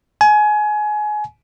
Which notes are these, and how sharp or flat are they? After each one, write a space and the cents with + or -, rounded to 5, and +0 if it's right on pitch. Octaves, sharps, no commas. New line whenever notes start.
G#5 +25